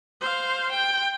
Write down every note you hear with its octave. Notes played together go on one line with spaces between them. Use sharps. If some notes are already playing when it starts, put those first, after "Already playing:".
C5 F5
G5